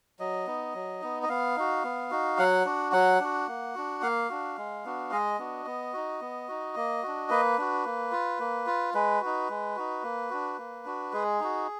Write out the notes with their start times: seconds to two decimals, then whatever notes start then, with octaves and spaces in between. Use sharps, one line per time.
0.20 F#3 D#5
0.47 B3 D#4
0.74 F#3
1.02 B3 D#4
1.23 D#5
1.29 B3 F5
1.56 D#4 F#4
1.84 B3
2.11 D#4 F#4
2.38 F#3 F#5
2.65 D4 F#4
2.92 F#3 F#5
3.20 D4 F#4
3.48 A#3
3.75 D4 F#4
4.02 A#3 F5
4.29 D4 F#4
4.57 G#3
4.84 B3 D4 F#4
5.12 G#3 D#5
5.39 B3 D4 F#4
5.66 B3
5.93 D#4 F#4
6.21 B3
6.48 D#4 F#4
6.76 A#3
7.03 D4 F#4
7.30 A#3 B4
7.58 D4 F#4
7.85 A#3
8.12 F4
8.39 A#3
8.67 F4
8.94 G#3 B4
9.21 D#4 F#4
9.49 G#3
9.76 D#4 F#4
10.03 A#3
10.30 D4 F#4
10.58 A#3
10.85 D4 F#4
11.13 G#3 G#4
11.40 D#4 F#4